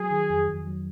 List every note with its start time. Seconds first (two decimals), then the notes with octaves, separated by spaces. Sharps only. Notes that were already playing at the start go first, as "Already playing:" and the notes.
Already playing: F#3 G#4
0.11 D#3
0.30 F2
0.49 F2
0.67 F#3